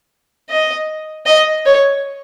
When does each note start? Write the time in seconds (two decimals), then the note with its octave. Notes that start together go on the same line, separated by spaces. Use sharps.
0.50 D#5
1.26 D#5
1.65 C#5